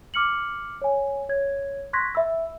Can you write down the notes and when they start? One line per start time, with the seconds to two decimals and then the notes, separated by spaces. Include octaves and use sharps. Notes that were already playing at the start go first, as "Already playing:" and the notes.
0.14 D6 F6 C#7 F#7
0.82 C#5 G#5
1.29 C#5 G#6
1.93 C6 C#6 F#6 G#6 A#6 B6
2.15 E5 B5 E6